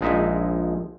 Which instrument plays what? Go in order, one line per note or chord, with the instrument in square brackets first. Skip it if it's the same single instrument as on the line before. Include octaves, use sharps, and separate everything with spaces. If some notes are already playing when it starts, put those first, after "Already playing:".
[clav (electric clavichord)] A#1 F3 G#3 D#4 E5